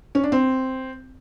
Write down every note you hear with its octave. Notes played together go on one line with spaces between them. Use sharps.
C#4
D4
C4